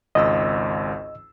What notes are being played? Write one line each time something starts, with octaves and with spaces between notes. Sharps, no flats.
G#1 C#2 D#5 E6